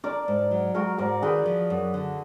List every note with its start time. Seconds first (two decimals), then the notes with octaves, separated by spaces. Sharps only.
0.04 D4 A#4 D5
0.28 G#2
0.51 F#3
0.75 G#3 F#4 A#4
0.98 G#2 A#4 D5
1.22 D#3 G#4 B4
1.45 F3
1.70 F#2
1.94 D3